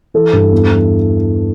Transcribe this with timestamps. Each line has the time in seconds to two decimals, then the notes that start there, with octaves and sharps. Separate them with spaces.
0.14 E3 A4
0.33 G2
0.52 E2
0.71 E3